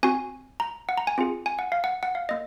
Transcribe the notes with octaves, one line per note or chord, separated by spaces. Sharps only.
C4 F#4 G#5
A#5
F#5
A#5
G#5
C4 F4 G#4
G#5
F#5
F5
F#5
F#5
F5
A#3 D#5